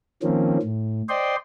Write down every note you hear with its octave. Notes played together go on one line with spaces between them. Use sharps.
D#3 F3 A#3 C4 C#4
A2
C5 D5 D#5 G5 C6